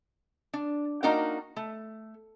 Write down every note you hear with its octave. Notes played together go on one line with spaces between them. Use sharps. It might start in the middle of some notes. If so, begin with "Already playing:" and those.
D4
A#3 D4 D#4 F#4 A#4 G5
A3